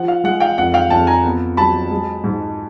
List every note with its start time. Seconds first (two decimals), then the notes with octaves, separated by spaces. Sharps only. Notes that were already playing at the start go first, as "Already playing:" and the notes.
Already playing: F3 F#5
0.08 F5
0.24 G#3 F#5
0.40 F5 G5
0.58 F2 F#5
0.74 F5 G5
0.90 F2 G5 A5
1.07 G#5 A#5
1.25 B3
1.57 F#3 A5 B5
1.91 G#3
2.24 G#2